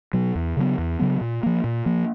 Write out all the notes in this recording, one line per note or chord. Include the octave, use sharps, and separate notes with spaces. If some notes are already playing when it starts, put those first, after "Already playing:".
B2 F#3
E2
C#3 F#3 B3
E2
C#3 F#3 B3
A#2
F3 A#3
A#2
F3 A#3